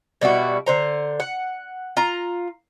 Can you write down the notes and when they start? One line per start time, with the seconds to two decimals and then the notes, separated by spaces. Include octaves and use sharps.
0.21 B2 G3 E4 F#4
0.66 D3 C5 A#5
1.20 F#5
1.97 F4 A#5